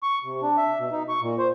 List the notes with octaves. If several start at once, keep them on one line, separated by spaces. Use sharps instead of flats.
C#6
C3
D4
E5
B2
D#4
C#6
A#2
C5